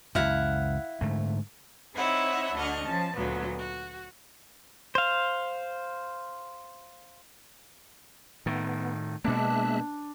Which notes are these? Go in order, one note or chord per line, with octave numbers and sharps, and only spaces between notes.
C#2 F#2 E4 F5 F#5
G#2 D3 A3
C4 D#4 E4 C#5 E5 F#5
D2 D4 D#5 F#5 C#6 F6
F3 C#4 A5
D2 A#2 F#3 B3
F#4
C5 F5
A2 D#3 B3
B2 G#3 A#3 D4 E5 F#6